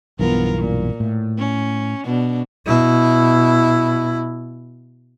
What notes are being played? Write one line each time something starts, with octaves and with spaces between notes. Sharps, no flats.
B1 G2 E3 B3 F4 A#4
A#2
A2
C#4
B2 D4
B2 E4